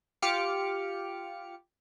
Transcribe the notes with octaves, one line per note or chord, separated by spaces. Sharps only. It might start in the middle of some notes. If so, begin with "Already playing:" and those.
F4 G4 D6 F6 C#7